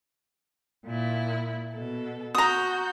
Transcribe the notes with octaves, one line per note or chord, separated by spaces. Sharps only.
A#2 E4
B2 A4
F#4 A#5 D#6 G6